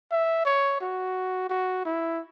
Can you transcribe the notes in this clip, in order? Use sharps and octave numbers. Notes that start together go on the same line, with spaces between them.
E5
C#5
F#4
F#4
E4